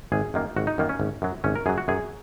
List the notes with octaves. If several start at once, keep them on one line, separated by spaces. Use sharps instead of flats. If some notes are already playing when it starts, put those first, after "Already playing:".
G#1 G#4
F#2 D#3 A#3
G#1 F#4
D#4
F#2 D#3 A#3
C#4
G#1
F#2 F#3
G#1 C#4
A#4
F#2 F#3 G#4
F#4
F#2 G#4